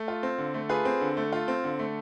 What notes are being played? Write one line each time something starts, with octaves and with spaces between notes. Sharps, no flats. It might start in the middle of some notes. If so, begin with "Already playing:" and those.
Already playing: A3
F4
C4
D3
A3
F4 G#4 B4
C4
D3
A3
F4
C4
D3
A3